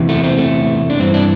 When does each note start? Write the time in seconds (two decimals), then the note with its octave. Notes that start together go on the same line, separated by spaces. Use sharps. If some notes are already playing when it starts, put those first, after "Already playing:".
Already playing: E2 C3 E3
0.09 A3
0.24 C4
0.38 A3
0.90 D4
0.99 G2 E3 C4
1.14 D4